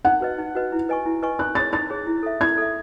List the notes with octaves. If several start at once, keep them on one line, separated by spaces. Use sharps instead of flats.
D#4 F#5
F#4 B4 D#5
D#4
F#4 B4 D#5
E4
B4 D#5 G#5 C#6
E4
B4 D#5 G#5 C#6
D#4 F#6
G#4 C#5 A6
D#4 A6
G#4 C#5
E4
A4 E5
E4 G#6
A4 E5